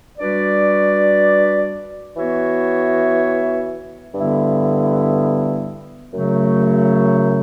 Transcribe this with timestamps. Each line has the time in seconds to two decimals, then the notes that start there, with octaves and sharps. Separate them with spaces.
0.18 G3 D4 F#4 B4 D5
2.16 E3 B3 F#4 C#5 E5
4.14 G2 D3 G3 B3 E4
6.12 F#2 C#3 F#3 A3